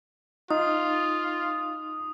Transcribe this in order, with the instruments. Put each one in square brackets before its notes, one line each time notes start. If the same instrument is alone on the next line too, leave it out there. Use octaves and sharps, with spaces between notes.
[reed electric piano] D#4 [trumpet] F4 [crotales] D#6